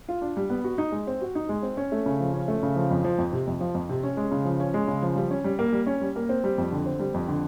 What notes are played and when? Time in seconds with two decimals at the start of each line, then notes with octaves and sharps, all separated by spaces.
0.08 F4
0.22 D4
0.37 G3
0.50 B3
0.64 F#4
0.78 D#4
0.92 G#3
1.07 C4
1.21 F#4
1.35 D#4
1.49 G#3
1.63 C4
1.77 C#4
1.92 A3
2.06 C#3
2.20 F3
2.33 C#4
2.48 A3
2.63 C#3
2.76 F3
2.91 F2
3.05 F3
3.18 F2
3.33 C3
3.47 F2
3.61 F3
3.75 F2
3.89 C3
4.03 C#4
4.17 G#3
4.31 C#3
4.45 F3
4.60 C#4
4.74 G#3
4.88 C#3
5.03 F3
5.16 G3
5.31 C#4
5.44 G3
5.59 A#3
5.73 G3
5.87 C#4
6.01 G3
6.16 A#3
6.29 C4
6.44 G3
6.58 F2
6.72 D3
6.86 C4
6.99 G3
7.14 F2
7.28 D3